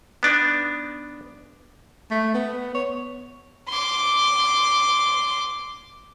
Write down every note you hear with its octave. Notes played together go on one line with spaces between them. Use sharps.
B3 D4 D#4
A3
B3
C#5
C6 D6